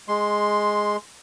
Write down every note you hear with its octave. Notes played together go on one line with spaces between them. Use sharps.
G#3 C6